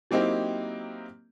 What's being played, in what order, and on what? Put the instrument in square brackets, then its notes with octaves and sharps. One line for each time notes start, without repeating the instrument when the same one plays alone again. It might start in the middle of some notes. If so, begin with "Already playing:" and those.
[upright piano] F#3 A#3 C4 D#4 E4 G4